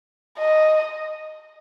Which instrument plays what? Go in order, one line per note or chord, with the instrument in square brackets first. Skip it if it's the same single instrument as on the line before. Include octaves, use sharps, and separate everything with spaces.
[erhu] D#5